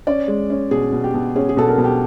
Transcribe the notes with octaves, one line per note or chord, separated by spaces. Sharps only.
C#4 D5
G#3
C#4
B2 G#4
B2
G4
B2
C#4 G#4
G#4
B2 A4
A#4
B2
G4